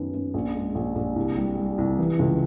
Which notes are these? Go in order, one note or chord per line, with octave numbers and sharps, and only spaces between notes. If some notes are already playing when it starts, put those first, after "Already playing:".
Already playing: F#2 D#3 B3
F#2
A#1
G#3
A#1
A#1
C2
G3
G3
C2
E3
C#2